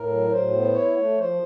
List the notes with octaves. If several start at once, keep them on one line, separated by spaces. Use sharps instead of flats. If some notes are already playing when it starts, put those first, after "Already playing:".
Already playing: A2 A#4
F#3
A2 C5
B3
E4 C#5
A3
F3 C5